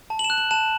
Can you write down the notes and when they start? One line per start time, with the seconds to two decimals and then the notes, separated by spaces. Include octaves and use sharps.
0.10 A5
0.19 F#7
0.24 E7
0.30 F#6
0.38 F#7
0.51 A5 E7